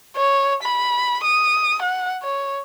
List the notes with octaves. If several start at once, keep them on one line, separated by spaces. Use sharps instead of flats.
C#5
B5
D#6
F#5
C#5